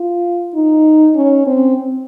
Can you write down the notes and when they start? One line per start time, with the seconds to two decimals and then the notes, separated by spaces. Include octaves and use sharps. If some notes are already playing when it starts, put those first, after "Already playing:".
Already playing: F4
0.55 D#4
1.15 C#4
1.47 C4